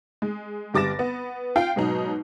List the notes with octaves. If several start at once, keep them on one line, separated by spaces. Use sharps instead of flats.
G#3
G1 G3 D6 A6 A#6 E7
B3
F4 G5 C7
G#2 B2 F#3 D#4